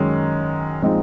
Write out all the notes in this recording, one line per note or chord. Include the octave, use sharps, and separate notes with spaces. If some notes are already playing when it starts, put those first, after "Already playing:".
Already playing: F#2 D#3 G#3 C#4
A#2 F3 G#3 C4 D#4